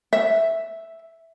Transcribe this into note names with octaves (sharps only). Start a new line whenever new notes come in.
E5